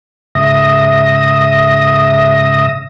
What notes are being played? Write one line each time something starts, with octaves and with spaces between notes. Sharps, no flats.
G#2 C#3 E5 D#6 A#6